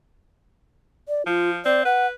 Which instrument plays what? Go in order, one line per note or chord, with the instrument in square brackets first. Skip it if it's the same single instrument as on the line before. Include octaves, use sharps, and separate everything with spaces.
[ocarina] D5
[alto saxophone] F3 [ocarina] F4
[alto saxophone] C4 [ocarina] D5
[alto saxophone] B4 [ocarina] F#5